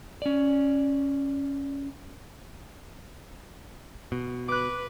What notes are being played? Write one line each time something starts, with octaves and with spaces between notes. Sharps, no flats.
C#4 D5
B2
B4 D6 F#6